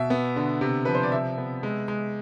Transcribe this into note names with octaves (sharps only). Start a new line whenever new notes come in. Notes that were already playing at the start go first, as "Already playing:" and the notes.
Already playing: B2 E5
B3
D3
C3
F3 B4
C5
D5
C3 E5
B3
G#3
G#3